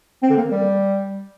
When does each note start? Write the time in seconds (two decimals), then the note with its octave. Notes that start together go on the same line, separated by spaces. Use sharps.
0.23 C4
0.30 D3
0.37 A#3
0.44 D#3
0.51 G3